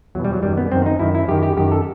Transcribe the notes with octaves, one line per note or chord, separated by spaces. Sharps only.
E2 B2 F#3
G3
F#3
F#2 D#3 G3
B3
F#2 D#3 C4
D#4
F#2 D#3 E4
E4
F#2 D#3 G4
G4
F#2 D#3 G4
A4